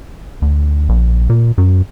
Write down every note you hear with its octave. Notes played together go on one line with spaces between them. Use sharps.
D2
A#1
A#2
F#2